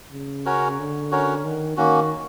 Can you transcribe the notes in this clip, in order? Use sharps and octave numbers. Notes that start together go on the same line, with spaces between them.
C#3
C#4 F#4 A#4 C#5
D3
C#4 F#4 A#4 C#5
D#3
D#3 A#3 C#4 F#4